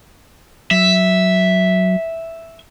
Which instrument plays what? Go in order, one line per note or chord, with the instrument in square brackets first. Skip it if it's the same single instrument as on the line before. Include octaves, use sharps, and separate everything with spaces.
[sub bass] F#3 [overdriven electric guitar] E5